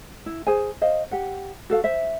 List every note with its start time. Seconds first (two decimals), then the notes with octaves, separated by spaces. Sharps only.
0.26 E4
0.47 G#4 C5 G#5
0.81 C5 D#5 F5
1.11 G4 F#5
1.70 F#4 A4 F5
1.84 C5 E5